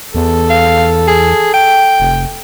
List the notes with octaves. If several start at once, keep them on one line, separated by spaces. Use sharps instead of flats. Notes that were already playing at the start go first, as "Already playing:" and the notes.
E2 A4
F5
G#4
G5
F1